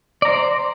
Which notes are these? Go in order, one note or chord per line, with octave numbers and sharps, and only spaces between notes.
C5 D5 A#5